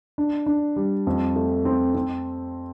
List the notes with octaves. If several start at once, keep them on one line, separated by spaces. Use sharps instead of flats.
D4
D4
G3
F2
A3
C4
C4